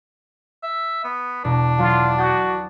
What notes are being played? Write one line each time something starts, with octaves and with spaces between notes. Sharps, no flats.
E5
B3
E1 D4
F#3 F4
F#4 D#6 G6 A6